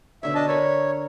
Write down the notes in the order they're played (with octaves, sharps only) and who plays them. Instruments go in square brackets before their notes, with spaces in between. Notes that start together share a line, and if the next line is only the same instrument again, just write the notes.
[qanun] B2 D3 C#5 [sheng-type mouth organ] E5
[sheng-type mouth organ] D4 D#5 A5
[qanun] A#4 E5 B5 [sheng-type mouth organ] C#5